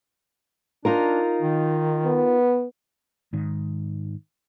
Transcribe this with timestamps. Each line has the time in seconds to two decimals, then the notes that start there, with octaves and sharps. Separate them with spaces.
0.85 D4 D#4 F4 A#4
1.42 D#3
2.05 B3
3.33 G#2 D#3